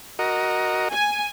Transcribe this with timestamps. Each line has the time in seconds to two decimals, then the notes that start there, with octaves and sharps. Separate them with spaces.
0.19 F#4 A#4 D#5
0.90 G#5